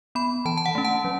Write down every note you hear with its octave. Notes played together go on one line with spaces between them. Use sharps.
B3 B5
E3 A5
A5
F#5
A3 C#4
A5
F#3